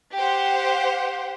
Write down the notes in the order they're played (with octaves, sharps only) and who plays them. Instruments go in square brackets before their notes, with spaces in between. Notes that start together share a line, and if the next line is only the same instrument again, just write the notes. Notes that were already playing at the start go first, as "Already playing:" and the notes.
[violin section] G4 C5 F#5